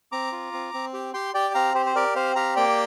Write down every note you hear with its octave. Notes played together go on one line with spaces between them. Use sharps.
C4 A#5 D6
F4
C4
C4
G4
G4 G5 C6
G4 D5 G5
C4 F5 A#5
G4 C5
C5
G4 A#4 D5
C4 C5 F5
G4 F5 A#5
A#3 D5 G5